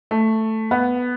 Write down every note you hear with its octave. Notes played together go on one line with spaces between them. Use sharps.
A3
B3